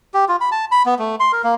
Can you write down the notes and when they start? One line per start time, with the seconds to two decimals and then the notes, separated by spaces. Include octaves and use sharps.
0.14 G4
0.29 F4
0.41 B5
0.52 A5
0.72 B5
0.86 B3
0.99 A3
1.20 C6
1.32 A#4
1.44 A#3